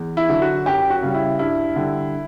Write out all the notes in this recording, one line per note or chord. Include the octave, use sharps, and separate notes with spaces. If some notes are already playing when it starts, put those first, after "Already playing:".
Already playing: E2
E4
D3 F#3
F#4
F#2 G4
F#4
C#3 G3
E4
G2 E4
D3 G3